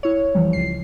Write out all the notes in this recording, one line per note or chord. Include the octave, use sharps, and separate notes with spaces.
E4 C#5
F2 E3 F3 G3
C#2 C7